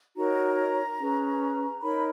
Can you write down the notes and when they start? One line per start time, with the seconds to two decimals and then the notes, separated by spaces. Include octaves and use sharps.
0.15 D#4 F#4 A#4 C#5 A#5
0.98 C#4 G#4 B4
1.81 D#4 A#4 C#5 B5